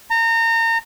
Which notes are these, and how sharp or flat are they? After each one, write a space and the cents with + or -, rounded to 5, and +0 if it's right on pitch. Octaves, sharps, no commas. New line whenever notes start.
A#5 -30